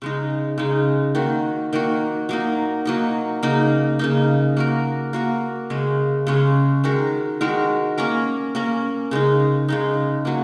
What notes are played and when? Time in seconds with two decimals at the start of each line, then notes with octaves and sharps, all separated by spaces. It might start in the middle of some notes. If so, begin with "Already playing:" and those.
0.02 C#3 G#3 D#4
0.58 C#3 G#3 D#4
1.15 D#3 A#3 F#4
1.73 D#3 A#3 F#4
2.29 F#3 A#3 D#4
2.85 F#3 A#3 D#4
3.43 C#3 A#3 D#4
3.99 C#3 A#3 D#4
4.57 A#3 F#4 A#4
5.13 A#3 F#4 A#4
5.70 C#3 G#3 C#4
6.27 C#3 G#3 C#4
6.84 D#3 G#3 F#4 A#4
7.41 D#3 G#3 F#4 A#4
7.98 A#3 C#4 A#4
8.55 A#3 C#4 A#4
9.11 C#3 G#3 D#4
9.68 C#3 G#3 D#4
10.25 F#3 A#3